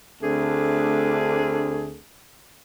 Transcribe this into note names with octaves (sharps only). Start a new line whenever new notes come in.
D2 A3 C4 D4 G#4